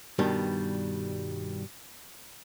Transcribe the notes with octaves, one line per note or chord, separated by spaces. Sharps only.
G2 B2 D#3 G3